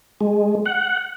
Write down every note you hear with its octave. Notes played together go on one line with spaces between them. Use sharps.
G#3
F#5